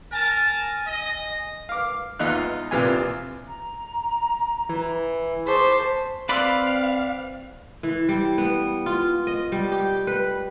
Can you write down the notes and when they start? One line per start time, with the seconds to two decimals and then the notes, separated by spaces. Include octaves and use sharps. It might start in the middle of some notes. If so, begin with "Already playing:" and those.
0.12 A#4 G#5 A5
0.87 D#5
1.69 F5 D6
2.19 E2 D#4 F4 F#6
2.71 A#1 C3 E3 F4 G#5
3.47 A#5
4.69 E3
5.47 G#4 C5 A5 C#6 D6 B6
6.29 C4 B4 D5 F5 B5 C6 E6
7.83 E3
8.09 G3
8.38 B3
8.86 F4
9.27 D#5
9.52 G3
9.72 G4
10.07 B4